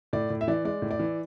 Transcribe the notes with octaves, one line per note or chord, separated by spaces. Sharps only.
A2 D5
A2
E5
E3 D5
G#3 D5
A2
D5
E3